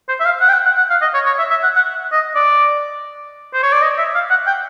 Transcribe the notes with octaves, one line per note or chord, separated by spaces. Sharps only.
C5
E5
F5
F#5
G5
F#5
F#5
F#5
F5
D#5
C#5
C#5
E5
E5
F#5
F#5
D#5
D5
C5
C#5
D5
D#5
E5
F5
F#5
G5